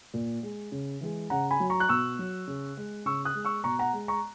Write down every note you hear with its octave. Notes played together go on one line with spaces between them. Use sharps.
A#2
G#3
C#3
E3 G#3
C#3 F#5 A#5
G#5 B5
F#3
A#5 C#6
F#6
B2 C#6 E6
F#3
C#3
G#3
C#3 C#6 E6
D#6 F#6
G#3
C#6 E6
B2 A#5 C#6
F#5 A#5
G#3
A#5 C#6